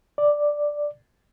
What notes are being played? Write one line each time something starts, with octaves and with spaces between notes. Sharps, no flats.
D5